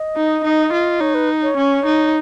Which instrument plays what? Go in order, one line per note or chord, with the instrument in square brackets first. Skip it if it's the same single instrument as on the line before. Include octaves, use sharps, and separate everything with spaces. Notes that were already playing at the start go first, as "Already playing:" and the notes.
Already playing: [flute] D#5
[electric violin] D#4
D#4
F4
[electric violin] D#4 [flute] C#5
[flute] B4
C#5
[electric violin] C#4
D#4